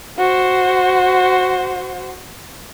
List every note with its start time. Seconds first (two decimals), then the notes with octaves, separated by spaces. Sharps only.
0.18 F#4 C5